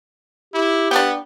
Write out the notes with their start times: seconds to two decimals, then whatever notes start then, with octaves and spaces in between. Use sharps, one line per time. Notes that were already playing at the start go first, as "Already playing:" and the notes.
0.54 E4 G4
0.91 B3 D4 G5